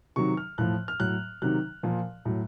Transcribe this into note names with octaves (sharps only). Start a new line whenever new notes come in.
C3 D#3 F#3 C#6
F6
A2 F3 F#6
F6
A2 F#3 F#6
C3 D#3 F#3 F#6
A#2 F3
A2 F#3